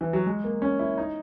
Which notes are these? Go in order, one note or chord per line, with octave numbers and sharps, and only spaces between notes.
E3
F#3
G#3
A#3
C#4
E4
D#4